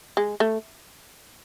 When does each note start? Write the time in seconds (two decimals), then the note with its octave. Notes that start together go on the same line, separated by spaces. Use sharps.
0.17 G#3
0.40 A3